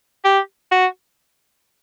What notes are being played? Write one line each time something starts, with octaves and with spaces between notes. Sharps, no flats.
G4
F#4